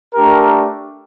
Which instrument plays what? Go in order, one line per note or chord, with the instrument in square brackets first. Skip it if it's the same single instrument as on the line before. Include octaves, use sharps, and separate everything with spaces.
[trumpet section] A3 D4 G4 A#4